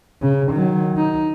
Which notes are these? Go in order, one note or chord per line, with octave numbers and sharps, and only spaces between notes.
C#3
D#3 F#3
D#4